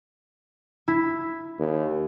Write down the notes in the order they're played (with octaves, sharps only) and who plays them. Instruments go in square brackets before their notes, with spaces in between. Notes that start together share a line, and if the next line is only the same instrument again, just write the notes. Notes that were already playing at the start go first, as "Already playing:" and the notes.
[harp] E4
[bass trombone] D#2